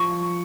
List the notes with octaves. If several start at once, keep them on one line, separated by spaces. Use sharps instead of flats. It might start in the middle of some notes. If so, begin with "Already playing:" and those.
Already playing: F3 C#6